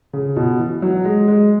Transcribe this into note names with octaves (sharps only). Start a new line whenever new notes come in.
C#3
B2
E3
F#3
G#3
G#3